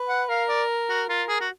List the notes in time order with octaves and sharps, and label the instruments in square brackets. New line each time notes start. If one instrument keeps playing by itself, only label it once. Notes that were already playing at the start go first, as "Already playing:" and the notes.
Already playing: [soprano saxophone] B4
[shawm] F#5
[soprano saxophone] A#4 [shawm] F5
[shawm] D5
F#4
[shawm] F4 [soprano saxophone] A#4
[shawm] G#4
F#4